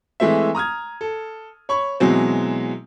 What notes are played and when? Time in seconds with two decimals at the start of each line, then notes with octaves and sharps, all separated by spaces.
0.20 E3 G#3 A3 C4 E5
0.55 A#5 D#6 F6 G#6
1.01 A4
1.69 C#5 B5 C#6
2.00 B2 E3 F#3 G#3 C4